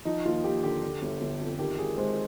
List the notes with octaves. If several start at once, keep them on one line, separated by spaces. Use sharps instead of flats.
F3 D#4
D#2 F4
D#2 G4
D3 G4
D3
G1
G1
F2
D#3 G4
G#1 G#4
G#3 C5